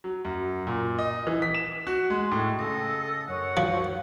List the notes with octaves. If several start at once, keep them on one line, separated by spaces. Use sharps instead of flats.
F#3
F#2
A#2
D#5
E3
B6
E7
F#4
G#3
A2
C#3 A4 D#5
F#2 C#5 F#5
D#3 F3 F#4 C5